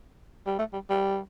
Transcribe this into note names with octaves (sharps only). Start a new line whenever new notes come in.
G3
A3
G3
G3